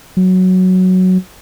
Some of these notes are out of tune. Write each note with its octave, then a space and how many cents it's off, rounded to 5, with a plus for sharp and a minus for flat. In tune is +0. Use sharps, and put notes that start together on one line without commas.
F#3 +0